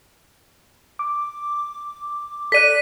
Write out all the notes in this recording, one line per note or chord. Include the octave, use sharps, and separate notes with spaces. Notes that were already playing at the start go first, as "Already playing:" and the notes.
D6
A4 D5 F#6 B6 D#7